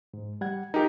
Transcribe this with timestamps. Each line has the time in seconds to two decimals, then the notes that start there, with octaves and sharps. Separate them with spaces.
0.14 G#2
0.41 G3 F#5 G#6
0.74 D#4 F4 G4 G#4 A#4